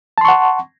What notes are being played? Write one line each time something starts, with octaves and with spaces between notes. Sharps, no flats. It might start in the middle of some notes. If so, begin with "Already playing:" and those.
F#5 A5 C6 C#6